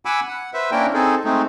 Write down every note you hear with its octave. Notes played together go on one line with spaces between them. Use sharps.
F#5 G#5 B5 D6 E6
F#5
B4 C5 E5
A#3 C#4 D4 E4 A#4 G5
C4 D#4 G#4 A4
G#3 A3 C4 D#4